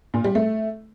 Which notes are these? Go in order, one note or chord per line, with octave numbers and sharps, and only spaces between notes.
A#2
G3
A3